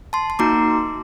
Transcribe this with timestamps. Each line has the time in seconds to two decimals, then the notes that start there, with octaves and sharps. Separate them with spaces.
0.13 A5 C6
0.30 C6
0.39 A#3 D#4 F#4 A#5 D6